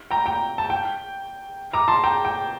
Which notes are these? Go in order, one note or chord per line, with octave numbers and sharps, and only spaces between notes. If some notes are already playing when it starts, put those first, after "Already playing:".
G5 A#5
G5 A#5
A5
G5
A#5 D6
A5 C6
G5 A#5
G5